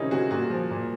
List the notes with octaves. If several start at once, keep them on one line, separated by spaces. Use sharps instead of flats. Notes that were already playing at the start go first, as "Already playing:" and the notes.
Already playing: C3 D#3 C#4 D#4 E4
C3 F#4 G#4
A#2 F#4 G#4
F3
A#2